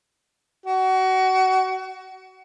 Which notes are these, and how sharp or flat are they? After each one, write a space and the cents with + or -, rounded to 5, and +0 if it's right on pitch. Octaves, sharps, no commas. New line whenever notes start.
F#4 +25